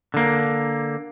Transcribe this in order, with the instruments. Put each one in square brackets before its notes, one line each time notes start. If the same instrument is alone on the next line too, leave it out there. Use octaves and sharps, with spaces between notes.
[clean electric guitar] D3 A#3